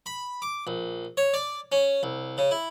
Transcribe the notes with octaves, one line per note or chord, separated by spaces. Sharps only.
B5
D6
A#1
C#5
D5
C#4
C2
C#3
E4